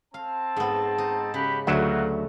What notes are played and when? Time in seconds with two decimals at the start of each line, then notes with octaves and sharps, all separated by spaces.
0.14 C4 F5 A5
0.56 G#2 B3
0.98 D#4
1.34 C#3 F#4 G4 B5
1.67 D2 F#3 A3 D#4 F4 F#4 E5